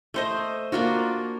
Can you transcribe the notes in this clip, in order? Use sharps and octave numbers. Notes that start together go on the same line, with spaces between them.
A3 C5 D#5
A#3 D4 F4 F#4